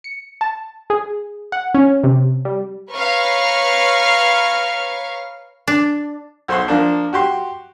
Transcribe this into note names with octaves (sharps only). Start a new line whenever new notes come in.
C#7
A5
G#4
F#5
C#4
C3
G3
B4 C#5 F5 A#5 C#6 F6
D4
B1 C5 F#5 C6
F3 A#3 D4
F#4 G4 C6